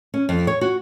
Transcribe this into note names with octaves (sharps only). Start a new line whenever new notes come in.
C#4
F2
C#5
F#4